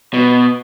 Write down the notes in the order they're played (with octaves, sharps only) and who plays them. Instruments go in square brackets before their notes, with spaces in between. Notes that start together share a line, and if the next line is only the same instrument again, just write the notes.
[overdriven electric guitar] B2